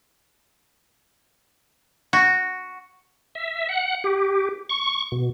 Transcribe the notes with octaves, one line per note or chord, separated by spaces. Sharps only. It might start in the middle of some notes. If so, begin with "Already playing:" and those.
F#4
E5
F#5
G4
C#6
B2